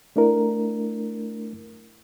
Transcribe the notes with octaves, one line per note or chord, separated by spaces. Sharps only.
A3 D4 E4 A#4